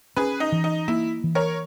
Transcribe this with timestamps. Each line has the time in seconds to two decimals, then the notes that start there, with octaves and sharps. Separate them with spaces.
0.16 C#4 G#4 B4
0.40 D#4
0.52 E3
0.64 D#4
0.88 A#3 E4
1.24 E3
1.35 A#4 C#5